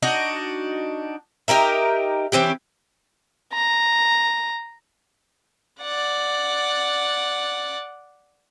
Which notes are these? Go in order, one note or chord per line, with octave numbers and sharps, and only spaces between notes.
D4 D#4 F#4
D#4 G4 A#4 E5
E3 C4 C#4 G4
A#5
D5 F#5